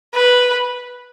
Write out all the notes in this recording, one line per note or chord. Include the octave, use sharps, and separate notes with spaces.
B4